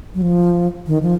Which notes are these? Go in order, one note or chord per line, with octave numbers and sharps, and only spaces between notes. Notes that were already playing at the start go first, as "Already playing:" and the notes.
F#3
F3
D#3
F3